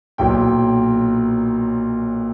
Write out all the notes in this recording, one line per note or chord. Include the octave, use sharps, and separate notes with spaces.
B1 A#2 F#3 G5